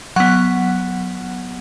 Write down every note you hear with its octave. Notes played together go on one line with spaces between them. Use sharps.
F#3 B3 F#5